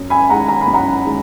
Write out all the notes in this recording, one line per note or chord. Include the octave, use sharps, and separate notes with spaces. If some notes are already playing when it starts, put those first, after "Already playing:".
Already playing: F#2
G#5 B5
D#3 G#3 F#5 A#5
A#5
B5
F#2
F#5 A#5
D#3 G#3